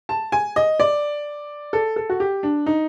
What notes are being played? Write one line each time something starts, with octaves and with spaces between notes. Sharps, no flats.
A5
G#5
D#5
D5
A4
A4
F#4
G4
D4
D#4